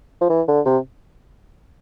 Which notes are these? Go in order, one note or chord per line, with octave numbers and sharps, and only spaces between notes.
F3
E3
D3
C3